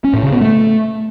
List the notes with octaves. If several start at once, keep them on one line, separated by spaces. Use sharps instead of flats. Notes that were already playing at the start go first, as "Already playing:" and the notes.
C#4
A2
C#3
B3
A3